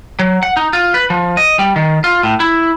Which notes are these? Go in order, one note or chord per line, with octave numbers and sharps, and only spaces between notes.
F#3
F#5
D#4
F4
B4
F3
D#5
G3
D#3
F4
A2
E4